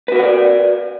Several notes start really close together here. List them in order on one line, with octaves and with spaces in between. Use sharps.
B4 F#4 A#4 F#5 D5